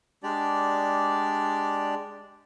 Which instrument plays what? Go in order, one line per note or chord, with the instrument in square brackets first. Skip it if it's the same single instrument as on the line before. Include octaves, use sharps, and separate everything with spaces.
[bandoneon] G#3 D4 G4 D5